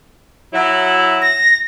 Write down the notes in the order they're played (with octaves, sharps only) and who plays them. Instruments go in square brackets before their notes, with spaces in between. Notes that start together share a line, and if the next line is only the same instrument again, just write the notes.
[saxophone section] F#3 E4
[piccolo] A#6